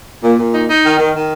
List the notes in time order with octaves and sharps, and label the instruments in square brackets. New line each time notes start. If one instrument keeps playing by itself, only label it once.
[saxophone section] A#2
A#2
D#4
D#4
D#3
D#3
D#3